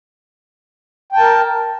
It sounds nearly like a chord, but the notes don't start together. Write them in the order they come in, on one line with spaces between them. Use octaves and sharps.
G5 A5 A#4